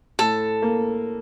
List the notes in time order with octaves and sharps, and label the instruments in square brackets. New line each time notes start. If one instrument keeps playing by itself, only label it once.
[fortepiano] A2 [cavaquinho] A4
[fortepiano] A#3